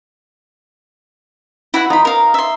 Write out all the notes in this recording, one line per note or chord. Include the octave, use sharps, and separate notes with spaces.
E4 F#4 F#5
D#4 F4 B5
A#4 F5
E5 C6